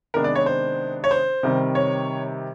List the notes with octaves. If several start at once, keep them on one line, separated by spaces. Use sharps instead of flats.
C3 D#3 G#3 B3 D4 A#4
D5
C#5
C5
C#5
C5
C3 D#3 G3 C4
C#5